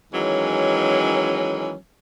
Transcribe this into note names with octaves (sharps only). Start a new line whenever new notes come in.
D#3 E3 F#3 G#3 C#4